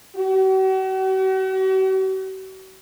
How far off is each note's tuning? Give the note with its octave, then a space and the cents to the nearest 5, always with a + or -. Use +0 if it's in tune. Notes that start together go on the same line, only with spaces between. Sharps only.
F#4 +45